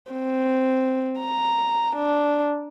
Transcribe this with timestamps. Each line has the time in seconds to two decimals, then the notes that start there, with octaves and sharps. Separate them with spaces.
0.11 C4
1.20 A#5
1.96 D4